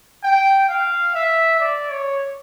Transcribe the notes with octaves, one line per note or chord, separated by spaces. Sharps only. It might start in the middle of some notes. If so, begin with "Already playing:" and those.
G5
F5
E5
D5
C#5